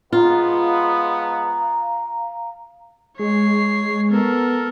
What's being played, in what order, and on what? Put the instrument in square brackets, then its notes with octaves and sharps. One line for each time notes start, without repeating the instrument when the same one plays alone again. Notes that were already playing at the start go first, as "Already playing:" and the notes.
[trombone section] F3 G#3 B3 [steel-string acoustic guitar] F4 [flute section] F5 A#5
[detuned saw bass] G#3 [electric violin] C#5 C7
[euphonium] B3 [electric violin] A4 A#4